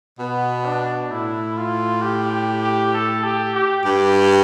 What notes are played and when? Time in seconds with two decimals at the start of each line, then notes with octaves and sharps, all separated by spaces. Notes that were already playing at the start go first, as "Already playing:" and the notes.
0.19 B2 B3
0.65 D4
1.10 A2 E4
1.57 F4
2.02 G4
2.32 G4
2.63 G4
2.93 A4
3.23 G4
3.55 G4
3.85 G2 G4